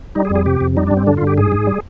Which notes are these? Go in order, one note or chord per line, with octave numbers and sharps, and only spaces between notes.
G3 D#4
G#4
F2
G#4
C3 G4
F2
G3 D#4
D4
G2
C4
D3 D4
F4
G2
G4
G#2 G#4
G#2
G3